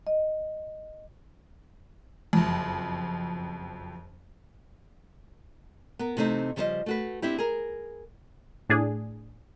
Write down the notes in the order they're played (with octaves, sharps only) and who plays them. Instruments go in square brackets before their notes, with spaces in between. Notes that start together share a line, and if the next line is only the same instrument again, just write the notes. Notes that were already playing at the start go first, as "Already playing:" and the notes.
[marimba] D#5
[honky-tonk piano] F#1 F2
[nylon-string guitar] B3 A#4
C3 E3 A3 C4 D#4 C5
C#3 F3 G3 A#4 C5 D#5
A3 F#4 B4
C4 D4 E4 G4
G#4 A#4
[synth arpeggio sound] A2 D4 G#4